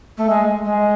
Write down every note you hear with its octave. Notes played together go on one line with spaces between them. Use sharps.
A3
G#3
G#3